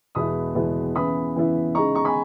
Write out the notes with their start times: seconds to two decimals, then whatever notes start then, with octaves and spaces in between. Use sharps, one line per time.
0.15 E2 B2 G#3 B3 E4 B5 D#6
0.55 E2 B2 G#3 B3 E4
0.95 C#3 E3 B3 E4 B5 D#6
1.35 C#3 E3 B3 E4
1.75 C#3 G#3 D#4 A#5 C#6
1.95 A#5 C#6
2.05 G#5 B5